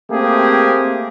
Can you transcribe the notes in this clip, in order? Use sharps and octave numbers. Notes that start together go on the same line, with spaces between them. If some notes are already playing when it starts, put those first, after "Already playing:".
A3 A#3 C4 G4 G#4